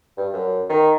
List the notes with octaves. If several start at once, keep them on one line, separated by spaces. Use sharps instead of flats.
G2
F#2
D#3